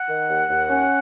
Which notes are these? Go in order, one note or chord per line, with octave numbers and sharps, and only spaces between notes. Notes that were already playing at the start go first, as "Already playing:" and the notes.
Already playing: F#5
D#3
D#2
D#2
C#4